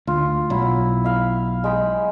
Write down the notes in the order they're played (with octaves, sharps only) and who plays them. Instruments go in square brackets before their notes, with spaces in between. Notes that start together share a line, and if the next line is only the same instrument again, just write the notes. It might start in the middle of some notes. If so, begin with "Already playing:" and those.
[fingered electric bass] D2 [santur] F4
[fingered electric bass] B1 [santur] F#3 E4 E6
[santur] E5 F5 B5
G#3 G5 B5